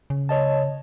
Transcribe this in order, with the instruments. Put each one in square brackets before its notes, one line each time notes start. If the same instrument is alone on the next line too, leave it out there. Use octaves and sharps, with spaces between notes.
[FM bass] C#3
[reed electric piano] C#5 D#5 A5